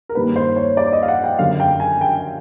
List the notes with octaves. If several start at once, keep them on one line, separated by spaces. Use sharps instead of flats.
A#4
G2 D#3 G3 A#3 C#4 B4
C5
C#5
D5
D#5
F5
F#5
G5
F#2 D3 G3 F5
G5
G#5
G5